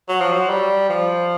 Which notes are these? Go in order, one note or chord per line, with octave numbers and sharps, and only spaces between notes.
F#3
F3
F#3
G3
F3